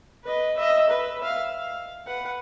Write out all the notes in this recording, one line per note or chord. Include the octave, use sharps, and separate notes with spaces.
B4 D#5
D#5 E5
B4
E5 F5
F5
B4 F#5